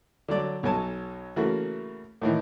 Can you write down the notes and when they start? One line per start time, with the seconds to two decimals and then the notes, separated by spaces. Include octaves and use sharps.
0.28 D3 F#3 D5
0.63 B1 F#3 A4 C#5 G#5 A5
1.36 C#3 E3 A3 A#3 F#4
2.22 A2 D#3 E3